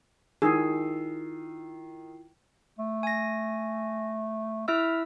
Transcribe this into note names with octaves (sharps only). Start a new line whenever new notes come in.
D#3 E4 F4 G#4 E6 C7
A3
G#5 A#6
E4 E5 E6 F6